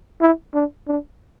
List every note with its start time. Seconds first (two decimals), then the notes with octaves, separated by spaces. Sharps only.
0.21 E4
0.54 D4
0.87 D4